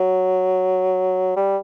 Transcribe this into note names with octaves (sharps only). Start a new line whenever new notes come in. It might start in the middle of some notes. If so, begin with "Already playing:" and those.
Already playing: F#3
G3